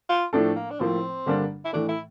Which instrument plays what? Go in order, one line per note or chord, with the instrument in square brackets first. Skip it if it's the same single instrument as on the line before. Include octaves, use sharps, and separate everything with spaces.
[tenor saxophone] F4
[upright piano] A2 F3 A3 D4 A4
[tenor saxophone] A#3
D4
[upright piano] A2 F3 A#3 [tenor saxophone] C4
[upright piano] G2 D3 G3 A#3 D4
[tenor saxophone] E4
[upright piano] A2 E3 A3 [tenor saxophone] D4
[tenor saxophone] E4